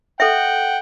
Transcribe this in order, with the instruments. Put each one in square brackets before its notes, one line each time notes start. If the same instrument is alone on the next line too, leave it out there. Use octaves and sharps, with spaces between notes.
[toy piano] A4 E5 [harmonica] F#5 G5